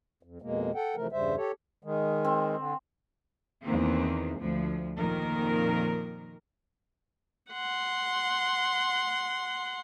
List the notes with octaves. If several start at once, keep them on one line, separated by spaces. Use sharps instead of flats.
F2
F2 B2 G#3 A#3
A4 F#5 G5
C3 E3 F3 A3 A#4
E2 G2 C#3 G3 C5 E5
G4 A4 C#5
D#3 G#3
C4
D3
E2 D#3 A#3 C4
D2 F3
F2 A#2 D#3 A#4
F#5 C6